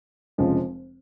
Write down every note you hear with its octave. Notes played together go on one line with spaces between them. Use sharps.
F1 F2 C#3 F3 G#3